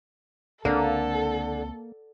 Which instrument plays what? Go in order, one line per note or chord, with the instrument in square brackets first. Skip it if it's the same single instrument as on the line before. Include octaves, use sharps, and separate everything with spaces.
[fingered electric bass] C#2 C4 [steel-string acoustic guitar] D3 [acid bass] A#3 [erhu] A4